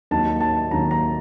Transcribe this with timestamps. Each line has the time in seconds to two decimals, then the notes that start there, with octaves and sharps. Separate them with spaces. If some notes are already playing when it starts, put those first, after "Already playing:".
0.11 D#2 D#3 F#3 A5
0.40 A5
0.71 D#2 D#3 F#3 A#5
0.91 A#5